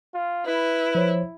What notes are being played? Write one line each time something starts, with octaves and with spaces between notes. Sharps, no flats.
F4
E4 B4
F3 C5 C#5